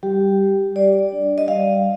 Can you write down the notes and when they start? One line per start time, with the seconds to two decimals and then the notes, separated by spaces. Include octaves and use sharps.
0.03 G3 G4
0.39 G3
0.76 G3 D5
1.12 D4
1.38 D#5
1.48 G3 F5